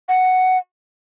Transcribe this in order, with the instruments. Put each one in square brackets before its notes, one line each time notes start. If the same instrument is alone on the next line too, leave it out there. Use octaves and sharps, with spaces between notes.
[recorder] F#5